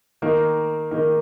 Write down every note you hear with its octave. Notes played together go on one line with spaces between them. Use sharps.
D#3 A#3 D#4 A#4 D#5
D#3 A#3 D#4 A#4 D#5